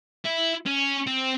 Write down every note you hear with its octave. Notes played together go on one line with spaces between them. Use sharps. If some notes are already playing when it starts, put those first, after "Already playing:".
E4
C#4
C4